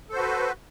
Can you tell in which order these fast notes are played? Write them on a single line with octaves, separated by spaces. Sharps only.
A4 C5 F#4 B4